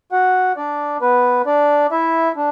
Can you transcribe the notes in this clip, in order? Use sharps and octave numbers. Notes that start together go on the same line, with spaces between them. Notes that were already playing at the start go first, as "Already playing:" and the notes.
F#4 F#5
D4 D5
B3 B4
D4 D5
E4 E5
D4